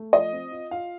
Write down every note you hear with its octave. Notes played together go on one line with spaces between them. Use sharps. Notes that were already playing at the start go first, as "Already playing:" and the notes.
Already playing: A3
F3 D#5
C4
F4
F4 F5